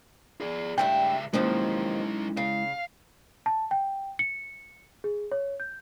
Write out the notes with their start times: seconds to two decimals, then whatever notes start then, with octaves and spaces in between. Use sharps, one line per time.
0.41 G#4 D5
0.78 C#2 G2 A3 E4 E5 G5
1.33 D#2 D#3 F3 F#3 G#3 C#4 D#4 E4
2.37 C#3 F5
3.46 A5
3.71 G5
4.19 C#7
5.04 G#4
5.32 C#5
5.60 G6